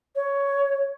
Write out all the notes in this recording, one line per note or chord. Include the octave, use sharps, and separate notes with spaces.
C#5